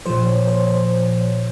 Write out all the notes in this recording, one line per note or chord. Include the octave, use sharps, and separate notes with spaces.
A#2 F3 C5
C#5
C5
C5